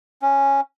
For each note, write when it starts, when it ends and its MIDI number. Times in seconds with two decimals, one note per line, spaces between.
0.22 0.61 61